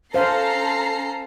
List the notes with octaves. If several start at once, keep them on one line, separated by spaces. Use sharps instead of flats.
C#4 A4 C5 F5 A#5 C7